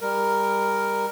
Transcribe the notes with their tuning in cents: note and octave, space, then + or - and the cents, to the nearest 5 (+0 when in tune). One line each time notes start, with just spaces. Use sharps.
G3 +25 A#4 +0